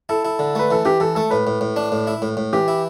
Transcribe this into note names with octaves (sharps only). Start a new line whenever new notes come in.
E4 A4
E4
D3
A3 B4
E3 A4
E3 G4
E3 A4
A3 A4
A2 B4
A2
A2
D4
A2
E4
A2
A2
E3 G4
E4